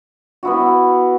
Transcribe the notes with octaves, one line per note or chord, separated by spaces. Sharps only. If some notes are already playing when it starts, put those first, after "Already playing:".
B3 E4 F#4